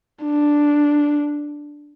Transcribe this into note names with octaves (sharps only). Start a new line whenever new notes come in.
D4